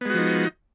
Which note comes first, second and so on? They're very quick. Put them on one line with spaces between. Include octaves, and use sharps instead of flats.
B3 G#3 F#4 F3 D#4